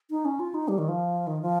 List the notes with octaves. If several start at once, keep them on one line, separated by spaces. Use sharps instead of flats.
D#4
C#4
F4
D#4
G3
D#3
F3
D#3
F3